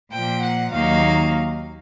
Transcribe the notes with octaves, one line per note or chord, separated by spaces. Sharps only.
A#2 F3 A#3 G5
F#5
D#2 D#3 F#3 A#3 D#4 F5